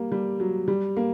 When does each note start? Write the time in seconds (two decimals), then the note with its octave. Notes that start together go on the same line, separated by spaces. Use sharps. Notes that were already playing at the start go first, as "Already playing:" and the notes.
Already playing: G3 A#3
0.12 G3
0.40 F#3
0.68 G3
0.97 A#3